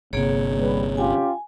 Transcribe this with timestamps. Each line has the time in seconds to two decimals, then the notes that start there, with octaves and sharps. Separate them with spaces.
0.13 G1 C3 A#3 G#4 C#5
0.59 G3 B4
0.97 C#4 F4 G4 G#5